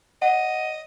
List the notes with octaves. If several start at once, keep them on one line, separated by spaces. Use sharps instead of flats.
D#5 F#5